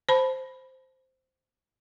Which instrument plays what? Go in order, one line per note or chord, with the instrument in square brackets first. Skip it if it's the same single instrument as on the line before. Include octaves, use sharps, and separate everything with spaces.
[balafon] C5 A5 B5